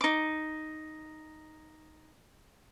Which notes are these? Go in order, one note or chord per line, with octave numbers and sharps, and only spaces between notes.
D#4 D6